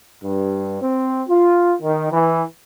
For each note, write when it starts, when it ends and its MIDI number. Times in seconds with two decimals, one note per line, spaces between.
0.22 0.78 43
0.81 1.22 60
1.28 1.74 65
1.82 2.10 51
2.11 2.43 52